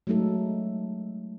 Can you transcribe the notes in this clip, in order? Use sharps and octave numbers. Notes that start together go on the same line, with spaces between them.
F#3 G#3 A3 D#4 A4